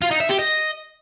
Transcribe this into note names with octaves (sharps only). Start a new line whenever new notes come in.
F4
D#4
E5
G4
D#5